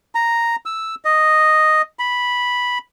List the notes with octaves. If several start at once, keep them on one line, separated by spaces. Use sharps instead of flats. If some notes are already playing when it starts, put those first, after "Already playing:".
A#5
E6
D#5
B5